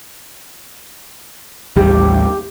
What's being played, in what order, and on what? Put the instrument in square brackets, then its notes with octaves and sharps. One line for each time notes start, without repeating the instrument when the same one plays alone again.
[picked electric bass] A1 D#2 G3 [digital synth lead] G4